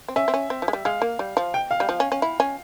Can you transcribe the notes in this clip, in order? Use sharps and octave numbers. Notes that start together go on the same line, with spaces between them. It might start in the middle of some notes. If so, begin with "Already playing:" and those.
C4
C#4 E5
C4
C#4
C4
F3
G#3
G3
G#3 F5
A#3
G3
F3
G5
F5
G3
F3
C#4
C#4
E4
C#4